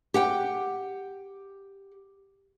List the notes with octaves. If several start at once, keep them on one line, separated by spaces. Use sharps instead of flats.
G4 F#5 G5